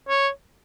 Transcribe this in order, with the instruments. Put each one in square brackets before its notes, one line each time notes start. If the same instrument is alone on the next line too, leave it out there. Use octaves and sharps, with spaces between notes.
[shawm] C#5